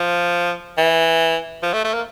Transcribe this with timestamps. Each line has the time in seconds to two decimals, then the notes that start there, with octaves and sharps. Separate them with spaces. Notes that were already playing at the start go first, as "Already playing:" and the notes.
Already playing: F3
0.78 E3
1.63 F3
1.73 A3
1.84 A3
1.94 A#3